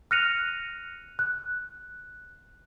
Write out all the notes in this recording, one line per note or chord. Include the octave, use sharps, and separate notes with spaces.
F6 F#6 A#6 C#7 D#7 F7
F#6